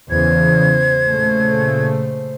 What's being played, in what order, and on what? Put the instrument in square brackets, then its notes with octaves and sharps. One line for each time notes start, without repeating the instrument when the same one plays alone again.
[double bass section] E2 C#3 E3 [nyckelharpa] C5 [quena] G#6
[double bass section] A#2 C#3 A3